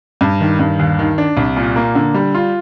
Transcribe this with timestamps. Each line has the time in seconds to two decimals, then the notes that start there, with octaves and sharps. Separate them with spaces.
0.21 G2
0.40 D#3
0.59 G2
0.79 D#2
0.99 D#3
1.18 D4
1.37 C2
1.57 A#2
1.76 A#3
1.95 D3
2.14 G3
2.35 F4